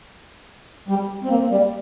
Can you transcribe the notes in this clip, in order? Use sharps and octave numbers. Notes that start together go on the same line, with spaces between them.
G3
C4
A#3
G3